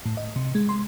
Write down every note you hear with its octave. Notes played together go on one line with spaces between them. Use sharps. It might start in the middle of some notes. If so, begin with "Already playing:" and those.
A2
D#5
C3
G#3
C6